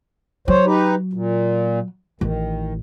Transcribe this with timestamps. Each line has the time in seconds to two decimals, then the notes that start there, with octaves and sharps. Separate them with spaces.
0.48 F#3 C5 C#5
0.65 D#4 G4 B4
1.13 A#2
2.21 A1 D#3